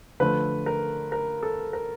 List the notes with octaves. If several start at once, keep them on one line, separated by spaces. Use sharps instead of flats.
D3 F3 A3 B4
A#4
A#4
A4
A#4